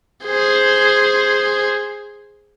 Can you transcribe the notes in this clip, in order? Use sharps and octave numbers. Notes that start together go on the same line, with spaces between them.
G#4 C5